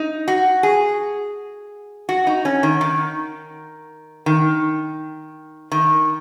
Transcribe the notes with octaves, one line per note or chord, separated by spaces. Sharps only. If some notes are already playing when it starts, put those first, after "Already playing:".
Already playing: D#4
F#4
G#4
F#4
D#4
C#4
D#3
D#3
D#3
D#3